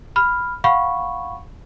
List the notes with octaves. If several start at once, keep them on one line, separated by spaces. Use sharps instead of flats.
B5 F6
F5 F#5 B5 C#6